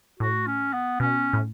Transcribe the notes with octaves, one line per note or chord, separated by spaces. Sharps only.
A2 F#4
C#4
B3
B2 C#4
A2